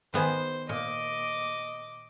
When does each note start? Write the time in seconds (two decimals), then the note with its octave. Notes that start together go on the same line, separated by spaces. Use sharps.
0.14 D#3 B3 G#4 C5
0.69 A#2 D#5 D6